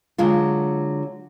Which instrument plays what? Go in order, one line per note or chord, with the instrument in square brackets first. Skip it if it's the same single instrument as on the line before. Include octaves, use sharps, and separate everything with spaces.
[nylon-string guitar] D3 F#3 G#3 F4